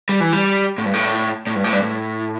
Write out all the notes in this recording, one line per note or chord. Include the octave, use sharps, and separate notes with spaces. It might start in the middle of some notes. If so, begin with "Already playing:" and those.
G3
E3
G3
A2
G2
A2
A2
G2
A2
G2
A2